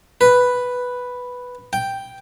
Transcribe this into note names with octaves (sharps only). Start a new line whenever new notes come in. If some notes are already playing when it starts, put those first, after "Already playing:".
B4
G5